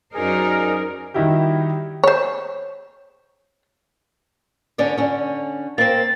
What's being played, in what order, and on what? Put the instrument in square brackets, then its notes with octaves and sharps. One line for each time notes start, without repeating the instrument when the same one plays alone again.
[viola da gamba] F#2 F#4 C5 [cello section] D#4 D5 [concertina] G#4 [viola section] A#4
[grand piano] D#3 G3 D#4 E4 F#4 G4
[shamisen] C5 C#5
[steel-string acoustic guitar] D3 C#4 D5
D3 C#4
[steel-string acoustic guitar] A#3 C4 [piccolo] A6